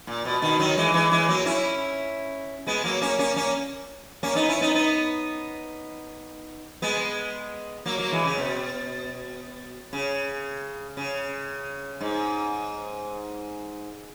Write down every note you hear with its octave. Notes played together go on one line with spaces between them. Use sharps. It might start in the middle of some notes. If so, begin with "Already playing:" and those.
A#2
B2
B2 D#3
D#3 F#3
E3 G#3
E3 G#3
E3 G#3
F#3 A#3
C#4 E4
G#3 B3
F#3 A#3
A#3 C#4
A#3 C#4
A#3 C#4
A#3 C#4
B3 D#4
C#4 E4
B3 D#4
B3 D#4
G#3 B3
F#3 A#3
F#3 A#3
E3 G#3
C#3
B2
C#3
C#3
G#2